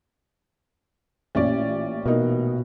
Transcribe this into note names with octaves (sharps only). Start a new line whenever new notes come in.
A1 A#2 C#4 D5
B2 A#3 D#4